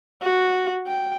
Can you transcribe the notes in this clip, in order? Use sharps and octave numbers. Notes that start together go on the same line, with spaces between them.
F#4
G5